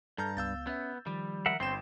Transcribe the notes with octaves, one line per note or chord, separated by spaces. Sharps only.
G2 A4 A5 A#5 F6 G6
C#2 B3 F5 E6 G6 A6
B3 C#4 E5
D#3 F3 G3
A#4 E5 F#5
G1 C4 G5 B5 C6 G6 E7